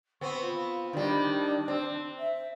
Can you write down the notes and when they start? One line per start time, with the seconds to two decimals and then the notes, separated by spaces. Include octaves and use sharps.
0.21 B3 C4 C#6
0.41 F4
0.93 D#3 G3 D4
1.68 C4
2.19 E5